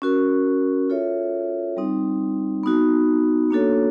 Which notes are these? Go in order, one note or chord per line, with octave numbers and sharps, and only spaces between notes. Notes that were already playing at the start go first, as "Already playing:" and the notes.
C#4 F#4 A#4
F4 A4 C#5 E5
G3 C4 D#4
B3 D#4 F#4
A#3 D4 F#4 A4 C#5